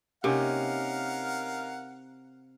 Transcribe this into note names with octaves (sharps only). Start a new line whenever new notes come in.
C3 A#3 C#4 D#4 A#4 F5 F#5